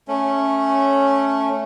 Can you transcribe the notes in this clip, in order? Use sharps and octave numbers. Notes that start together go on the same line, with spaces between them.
A3 C#4